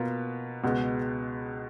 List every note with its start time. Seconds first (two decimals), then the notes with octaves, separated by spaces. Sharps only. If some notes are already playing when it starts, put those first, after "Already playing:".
Already playing: B2 A#3 F4 B4
0.63 C#2 B2 G#3 B3